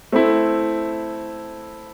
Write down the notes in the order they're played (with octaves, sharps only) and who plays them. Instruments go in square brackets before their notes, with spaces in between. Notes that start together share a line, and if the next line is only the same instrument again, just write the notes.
[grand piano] A3 C4 E4